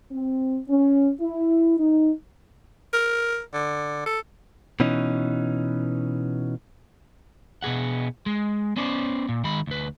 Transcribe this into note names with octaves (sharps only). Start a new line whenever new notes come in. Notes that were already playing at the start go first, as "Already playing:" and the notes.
C4
C#4
E4
D#4
A#4
D3
A4
B2 E3 C#4 D#4
B2 B3 G#4 F#5
G#3
B3 C#4 C5 D5
A#2
D#3 G#3 B5
D2 B4